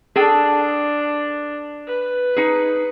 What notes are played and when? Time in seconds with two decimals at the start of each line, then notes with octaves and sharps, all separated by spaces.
0.16 D4 G#4 A4 G5
1.87 B4
2.36 D#4 G#4